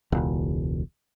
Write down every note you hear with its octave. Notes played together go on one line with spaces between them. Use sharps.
E1 C#2